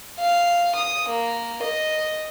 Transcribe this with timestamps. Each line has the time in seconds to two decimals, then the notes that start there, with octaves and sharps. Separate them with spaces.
0.19 F5
0.75 D#6
1.08 A#3
1.62 D#5